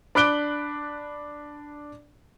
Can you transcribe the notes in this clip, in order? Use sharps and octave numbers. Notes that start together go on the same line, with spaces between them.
D4 B5 D6 F#6 D7 G7